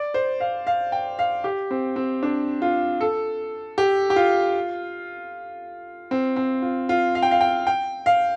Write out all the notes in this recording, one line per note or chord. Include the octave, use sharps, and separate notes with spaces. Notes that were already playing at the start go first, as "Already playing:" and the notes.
Already playing: D5
C5
F5
F5
G5
F5
G4
C4
C4
D4
F4
A4
G4
G4
F4
C4
C4
F4
F4
F5
G5
F5
G5
G5
F5